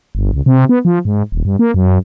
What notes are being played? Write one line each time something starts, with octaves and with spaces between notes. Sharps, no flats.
G1
C#2
C3
B3
F3
G#2
D#1
G2
A#3
F#2